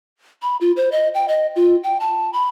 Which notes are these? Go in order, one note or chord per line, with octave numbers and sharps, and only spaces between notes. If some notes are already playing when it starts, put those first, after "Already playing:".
B5
F4
C5
D#5
G5
D#5
F4
G5
A5
B5